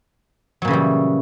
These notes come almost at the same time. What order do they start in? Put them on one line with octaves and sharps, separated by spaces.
F#3 A#2 C#3 E3 G3